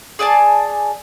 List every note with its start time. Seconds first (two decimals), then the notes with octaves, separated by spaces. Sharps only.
0.19 G#4 D5 G#5 A5